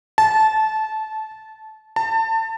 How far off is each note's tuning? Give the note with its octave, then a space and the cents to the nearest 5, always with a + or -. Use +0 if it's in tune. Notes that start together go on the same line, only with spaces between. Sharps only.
A5 -15
A5 +30